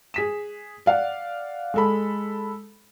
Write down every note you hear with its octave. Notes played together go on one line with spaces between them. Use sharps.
G#4 B6 E7
D5 F5 F#5
G#3 A4 B5